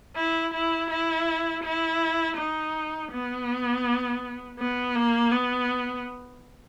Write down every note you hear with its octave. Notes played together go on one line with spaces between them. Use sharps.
E4
E4
E4
E4
D#4
B3
B3
A#3
B3